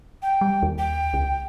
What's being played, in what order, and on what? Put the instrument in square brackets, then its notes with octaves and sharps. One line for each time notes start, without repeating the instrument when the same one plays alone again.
[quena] G5
[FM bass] G3
D#2
[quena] G5
[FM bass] C#2